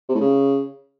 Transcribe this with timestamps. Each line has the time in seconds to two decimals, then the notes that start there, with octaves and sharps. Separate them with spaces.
0.09 C3
0.15 A2
0.21 C#3